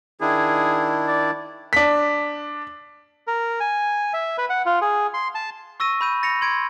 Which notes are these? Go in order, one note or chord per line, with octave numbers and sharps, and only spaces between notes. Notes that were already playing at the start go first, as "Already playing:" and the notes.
D#3 D4 E4 G#4
D5
D4 B6
A#4
G#5
E5
B4
F#5
F4
G#4
C6
A5
C#6 E6 A#6 D#7
B5 G6 D#7
A6 A#6 C#7 F7
C6 G#6 D7